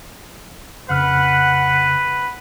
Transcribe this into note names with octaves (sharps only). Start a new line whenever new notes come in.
F2 C#3 B4 F#5 F6